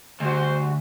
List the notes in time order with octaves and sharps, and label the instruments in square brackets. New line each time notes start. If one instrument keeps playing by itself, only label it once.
[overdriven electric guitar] D2 [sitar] G3 F#4 [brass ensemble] C5